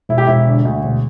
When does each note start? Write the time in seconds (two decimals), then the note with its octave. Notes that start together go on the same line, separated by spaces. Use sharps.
0.09 E1 E4
0.18 G4
0.27 E1 E4
0.47 D3
0.65 D2
0.83 E1